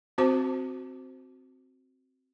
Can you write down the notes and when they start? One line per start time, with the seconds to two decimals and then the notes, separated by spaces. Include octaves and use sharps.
0.18 C4 F#4 C5 A5 D6